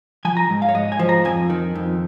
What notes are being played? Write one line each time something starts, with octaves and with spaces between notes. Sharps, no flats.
F3 G#5
A#5
G#2
F5
C#5
G#2 D#5
G#5
F3
A#5
F2 G#5
D#3
F2